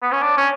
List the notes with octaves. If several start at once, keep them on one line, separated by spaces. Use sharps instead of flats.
B3
C#4
D4
C#4